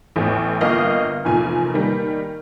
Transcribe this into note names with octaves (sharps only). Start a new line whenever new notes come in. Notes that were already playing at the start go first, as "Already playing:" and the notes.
A1 E2 A2
G1 A#3 D#5 F5 F6
F1 E2 A#2 G#5
D#3 G3 A#3